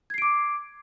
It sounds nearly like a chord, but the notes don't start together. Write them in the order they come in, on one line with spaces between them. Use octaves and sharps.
G#6 C7 D7 D6